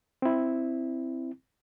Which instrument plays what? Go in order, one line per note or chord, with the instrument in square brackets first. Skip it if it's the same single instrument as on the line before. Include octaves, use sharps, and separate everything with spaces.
[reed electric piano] C4 E4